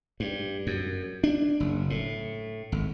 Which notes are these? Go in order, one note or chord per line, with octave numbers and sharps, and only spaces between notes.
G2
F#2
D4
F#1
A2
G#1